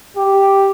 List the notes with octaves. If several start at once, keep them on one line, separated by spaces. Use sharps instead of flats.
G4